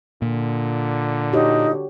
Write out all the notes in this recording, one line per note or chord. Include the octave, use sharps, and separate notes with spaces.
A#2 D3 A#3
D#4 F#4 G4 C#5